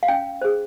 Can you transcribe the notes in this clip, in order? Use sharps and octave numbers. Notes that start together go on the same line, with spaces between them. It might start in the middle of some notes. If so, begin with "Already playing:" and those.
F5
C#4 G5
G#4 C5